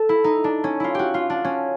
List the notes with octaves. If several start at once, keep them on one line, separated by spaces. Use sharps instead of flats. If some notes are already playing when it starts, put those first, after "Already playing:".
Already playing: A4
E4
D#4
D4
C#4
E4 F4
F#4 G4
F4
D4
C#4